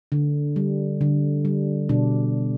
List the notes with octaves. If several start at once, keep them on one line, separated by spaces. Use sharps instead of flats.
D3
G3
D3
G3
B2 D4